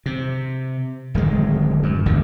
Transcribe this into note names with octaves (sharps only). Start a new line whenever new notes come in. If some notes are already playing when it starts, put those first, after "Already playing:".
C3
D1 D#3 G#3
F#2
G1 E2 G#2 D3